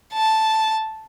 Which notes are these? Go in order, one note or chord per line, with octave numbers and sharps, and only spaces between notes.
A5